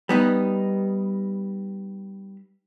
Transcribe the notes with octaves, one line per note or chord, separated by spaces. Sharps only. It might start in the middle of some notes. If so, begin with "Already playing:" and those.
G3 B3 D#4